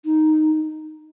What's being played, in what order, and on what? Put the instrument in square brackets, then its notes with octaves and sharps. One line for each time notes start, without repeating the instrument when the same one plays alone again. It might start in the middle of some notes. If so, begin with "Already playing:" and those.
[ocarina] D#4